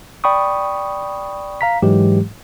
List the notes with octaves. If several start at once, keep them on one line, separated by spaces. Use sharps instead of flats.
D5 G5 B5 C#6 D#6
F5 A#5 B6
G#2 E3 F#3 G#3 G4